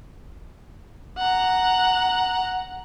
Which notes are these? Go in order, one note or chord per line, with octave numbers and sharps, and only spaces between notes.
F#5 A#5